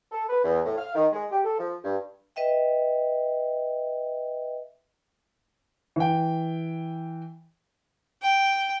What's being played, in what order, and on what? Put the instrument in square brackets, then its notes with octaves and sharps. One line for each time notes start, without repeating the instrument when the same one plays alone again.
[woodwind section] A4
B4
E2
A2
F5
D#3
G#3
G4
A4
F3
G2
[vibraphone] B4 D#5 E5 G5
[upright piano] E3 G5
[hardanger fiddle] G5